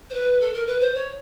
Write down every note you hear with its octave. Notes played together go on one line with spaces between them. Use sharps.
C5
B4
A4
A#4
B4
C5
C#5